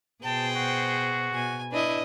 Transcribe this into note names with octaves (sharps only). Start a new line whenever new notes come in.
B2 G#4 C5 G5 A5
F#4
B2 G#5
D4 E4 B4 D#5